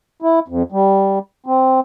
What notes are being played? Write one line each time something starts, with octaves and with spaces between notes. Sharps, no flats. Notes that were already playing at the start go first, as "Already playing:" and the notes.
E4
F2
G3
C4